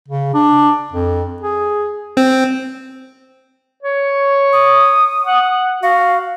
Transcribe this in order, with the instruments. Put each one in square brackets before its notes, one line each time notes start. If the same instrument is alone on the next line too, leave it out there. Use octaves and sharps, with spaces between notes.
[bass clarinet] C#3
D4
F2
G#4
[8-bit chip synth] C4
[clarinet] C#5
[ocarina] D#6
[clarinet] F#5
[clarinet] F#4 [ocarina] F5